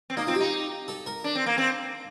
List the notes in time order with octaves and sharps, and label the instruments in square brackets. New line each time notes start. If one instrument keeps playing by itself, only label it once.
[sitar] C4
[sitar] A#3 [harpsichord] D#4
[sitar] C4 [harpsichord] F4
[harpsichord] G4
[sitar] D#4
[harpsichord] A4
A#4
[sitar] D4
C4
A#3
C4